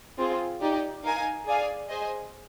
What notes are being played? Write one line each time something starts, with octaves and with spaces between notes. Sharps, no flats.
C4 F4 G#4
D#4 G4 D5
D#4 A#4 F5 G#5
G#4 D5 F5 G#5
G#4 C5 D#5 G#5